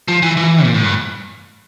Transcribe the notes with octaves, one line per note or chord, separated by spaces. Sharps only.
F3
E3
E3
A#2
A2
G2